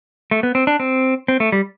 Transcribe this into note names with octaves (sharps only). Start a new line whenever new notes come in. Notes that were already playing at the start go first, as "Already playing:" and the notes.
A3
B3
C4
D4
C4
C4
A3
G3